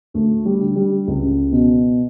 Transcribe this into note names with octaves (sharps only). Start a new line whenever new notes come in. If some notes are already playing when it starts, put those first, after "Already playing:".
D2 A3
G3
D3
G3
C#2
B2